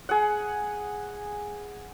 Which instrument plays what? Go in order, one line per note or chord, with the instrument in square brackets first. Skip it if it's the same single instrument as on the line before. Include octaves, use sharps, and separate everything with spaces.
[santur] G#4 F#5